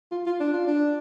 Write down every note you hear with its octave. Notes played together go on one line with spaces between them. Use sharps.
F4
F4
D4
F4
D4